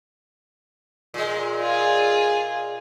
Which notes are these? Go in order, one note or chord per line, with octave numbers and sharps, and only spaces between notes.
A#2 G#3
F4 G#4